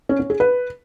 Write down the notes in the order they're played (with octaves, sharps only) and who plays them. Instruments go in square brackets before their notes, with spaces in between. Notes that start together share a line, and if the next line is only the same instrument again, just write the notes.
[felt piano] C#4
C#4
G#4
B4